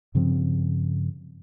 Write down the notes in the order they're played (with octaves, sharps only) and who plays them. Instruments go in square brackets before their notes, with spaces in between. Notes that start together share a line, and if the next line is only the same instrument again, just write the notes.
[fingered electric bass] G2 C#3 F3 C4